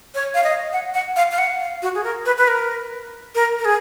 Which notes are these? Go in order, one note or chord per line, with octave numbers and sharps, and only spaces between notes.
C#5
F5
D#5
F#5
F#5
F5
F5
F#5
F5
F#4
G#4
A#4
B4
B4
A#4
A#4
A#4
G#4